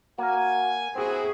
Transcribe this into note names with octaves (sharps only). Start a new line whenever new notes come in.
A#3 F#4 A#4 G#5
C4 E4 F#4 G#4